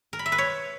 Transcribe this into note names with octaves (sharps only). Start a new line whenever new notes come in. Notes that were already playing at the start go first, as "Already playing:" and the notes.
A#4
B5
E5
B4
C#5